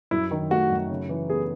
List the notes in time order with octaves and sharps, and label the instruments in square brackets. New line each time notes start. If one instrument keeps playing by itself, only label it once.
[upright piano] F#2 [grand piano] E4
[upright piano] D#3
[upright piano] A3 [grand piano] F#4
[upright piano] F#2
C#3
E3
[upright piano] B3 [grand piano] G#4